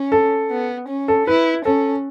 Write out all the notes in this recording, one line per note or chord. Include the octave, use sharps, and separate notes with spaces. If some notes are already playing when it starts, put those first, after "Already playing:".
Already playing: C#4
A4
B3
C#4
A4
E4 B4
C#4 A4